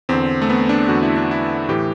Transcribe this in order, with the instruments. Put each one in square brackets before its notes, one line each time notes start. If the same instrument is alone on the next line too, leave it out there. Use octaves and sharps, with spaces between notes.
[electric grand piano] E2 D3 C4
A3
B3
D4
E2 D3 F#4
E4
D4
E4
A2 E3 G4